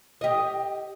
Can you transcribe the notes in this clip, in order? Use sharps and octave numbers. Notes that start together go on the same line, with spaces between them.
G4 D#5